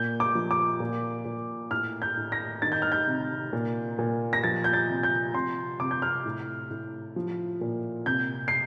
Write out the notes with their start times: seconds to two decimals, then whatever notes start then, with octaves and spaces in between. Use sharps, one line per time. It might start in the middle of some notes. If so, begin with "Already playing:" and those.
Already playing: A#2 G6
0.20 D6
0.35 F3
0.51 D6
0.80 A#2
1.25 A#2
1.71 A2 F6
2.02 G6
2.17 A2
2.32 A#6
2.62 D#3 A6
2.72 G6
2.82 F6
2.92 G6
3.07 C3
3.53 A#2
3.99 A#2
4.33 A#6
4.44 F3 A6
4.64 G6
4.73 A6
4.89 C3
5.03 G6
5.34 C3 C6
5.80 C3 D6
5.91 G6
6.02 F6
6.26 A2
6.71 A2
7.16 F3
7.61 A#2
8.06 C3 G6
8.48 C7